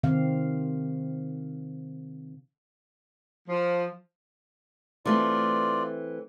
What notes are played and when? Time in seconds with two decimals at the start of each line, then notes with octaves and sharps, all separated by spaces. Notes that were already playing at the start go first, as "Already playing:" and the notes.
0.04 C3 D#3 C4 F5
3.49 F3
5.06 E3 A3 C4 F4 D5